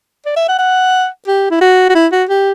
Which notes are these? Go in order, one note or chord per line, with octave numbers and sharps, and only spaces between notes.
D5
E5
F#5
F#5
G4
E4
F#4
F#4
E4
F#4
G4